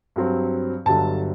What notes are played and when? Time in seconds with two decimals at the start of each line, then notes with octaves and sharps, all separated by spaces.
0.16 G2 F#3 C4
0.86 G1 G2 D3 F#3 A5